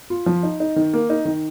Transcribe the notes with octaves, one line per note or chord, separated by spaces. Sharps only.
F4
F3
D#4
D#4
D#3
A#3
D#4
D#3